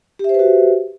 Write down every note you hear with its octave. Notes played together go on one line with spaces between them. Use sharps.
F#4 G4 B4 C5 E5